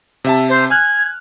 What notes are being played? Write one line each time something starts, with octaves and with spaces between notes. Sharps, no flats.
C3 E5 A5
C5
G#5 F6 F#6 G#6